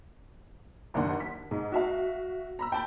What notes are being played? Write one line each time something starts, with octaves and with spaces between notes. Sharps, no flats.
F#1 D#2 D4 F#5 C6
B6
G#2
F#4 E5 F5
A#5 B5 E6
G5 A5 B5